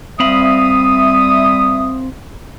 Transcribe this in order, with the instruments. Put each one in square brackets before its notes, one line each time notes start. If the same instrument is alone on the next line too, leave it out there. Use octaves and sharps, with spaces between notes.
[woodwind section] G3 E5 D#6 [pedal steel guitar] C4 F5 B5